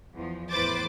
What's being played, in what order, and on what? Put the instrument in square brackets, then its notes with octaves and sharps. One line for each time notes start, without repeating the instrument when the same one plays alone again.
[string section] E2 F3
E2 A2 B4 C5 D6 A6